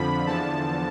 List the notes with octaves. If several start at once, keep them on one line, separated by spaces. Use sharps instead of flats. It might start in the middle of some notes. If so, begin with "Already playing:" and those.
Already playing: F2 D3 F3 B5
E2 D3 F3 A5